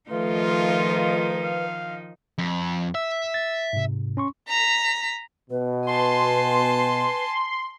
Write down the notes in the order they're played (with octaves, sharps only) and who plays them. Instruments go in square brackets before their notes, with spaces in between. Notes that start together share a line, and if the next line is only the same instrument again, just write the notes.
[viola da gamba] D#3 F3 D#4 [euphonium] A3 [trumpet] F4 [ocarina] B4
[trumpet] F5
[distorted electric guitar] F2
[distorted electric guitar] E5 [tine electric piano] E6
[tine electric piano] A6
G#2 C3
C#4 C6 C#6
[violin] A#5 B6
[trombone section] B2 [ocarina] B4
[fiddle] G#5 A5 [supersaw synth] C6